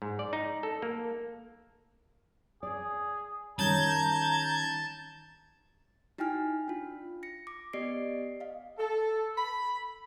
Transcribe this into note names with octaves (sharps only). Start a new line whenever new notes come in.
G#2
D5
D#4
A4
A#3
G#4 D5
D#3 G3 C#4 A5 A#5 G6 G#6
D#4 E4 F#4 G5 G#5 F6
D4 F4
A#6 C#7
D6
B3 G4 D5 D#5 C7 D7
D#5 F5
A4
B5